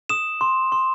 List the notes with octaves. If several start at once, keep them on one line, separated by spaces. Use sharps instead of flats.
D#6 E7
C6
C6